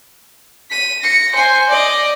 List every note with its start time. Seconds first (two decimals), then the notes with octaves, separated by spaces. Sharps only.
0.70 B6 D#7
1.01 A#6 C#7
1.35 C5 G#5
1.69 D5 D#5